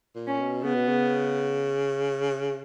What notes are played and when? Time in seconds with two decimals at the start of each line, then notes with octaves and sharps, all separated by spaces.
0.15 A#2
0.27 C#4
0.39 B2
0.63 C#3 B3
0.75 B2
0.88 C#3